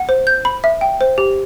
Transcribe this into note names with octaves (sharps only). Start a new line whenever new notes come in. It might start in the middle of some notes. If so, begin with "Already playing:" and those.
Already playing: F#5
C5
G6
B5
E5
G5
C5
G4